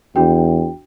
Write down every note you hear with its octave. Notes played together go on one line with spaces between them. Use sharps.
E2 D4 F#4 G5